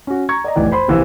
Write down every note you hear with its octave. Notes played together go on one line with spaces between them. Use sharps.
C#4 F#4
A#5 C#6 G#6
D5 D#5 A#5
F1 B1 A2 E3 D5
C5 B5 C6
A#1 C3 E3 C5 F5 E6